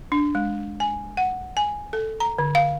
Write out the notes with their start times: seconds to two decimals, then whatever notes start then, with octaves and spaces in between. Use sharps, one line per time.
0.12 D4
0.35 G#3
0.80 G#5
1.17 F#5
1.57 G#5
1.93 A4
2.20 A#5
2.38 D3
2.55 F5